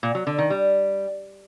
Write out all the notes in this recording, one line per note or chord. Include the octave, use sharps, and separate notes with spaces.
A#2
F#3
D3
D#3
G3